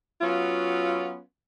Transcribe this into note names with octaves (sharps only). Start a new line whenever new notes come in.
F#3 B3 C#4 F4